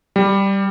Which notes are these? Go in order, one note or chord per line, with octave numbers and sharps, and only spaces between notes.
G3